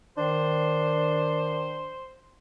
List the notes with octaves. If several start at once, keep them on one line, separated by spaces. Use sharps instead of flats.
D#3 D4 C5